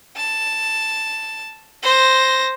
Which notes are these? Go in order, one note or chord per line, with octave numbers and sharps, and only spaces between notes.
A5
C5 A#6